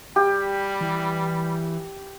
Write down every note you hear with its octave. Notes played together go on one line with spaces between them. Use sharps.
G3 G4
E3